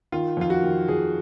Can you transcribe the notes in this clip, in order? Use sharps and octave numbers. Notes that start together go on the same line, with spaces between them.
D#3 F4
F2 F4
F#4
D#3
F2 G#4